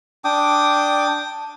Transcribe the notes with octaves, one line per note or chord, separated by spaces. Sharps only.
D4 G5 D6 D#6